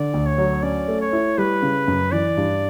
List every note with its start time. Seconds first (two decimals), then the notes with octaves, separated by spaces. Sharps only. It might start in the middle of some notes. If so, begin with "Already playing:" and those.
Already playing: D3 D5
0.14 D2
0.26 C#5
0.38 F#3
0.63 C#4 D5
0.88 A3
1.01 C#5
1.13 E4
1.38 G3 B4
1.62 C#3
1.88 F#2
2.12 E3 D5
2.37 G2